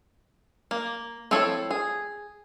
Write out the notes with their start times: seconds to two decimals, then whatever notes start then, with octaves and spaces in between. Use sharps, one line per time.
0.71 A#3
1.31 F3 C4 E4 A4 C#5
1.71 G#4